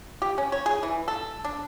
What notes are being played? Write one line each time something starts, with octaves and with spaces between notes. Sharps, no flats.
G4
C#4
C#5
G#4
E3
A4
D4